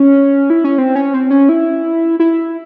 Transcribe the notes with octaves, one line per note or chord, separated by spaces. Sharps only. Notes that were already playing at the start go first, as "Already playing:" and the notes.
Already playing: C#4
E4
C#4
C4
C#4
C4
C#4
E4
E4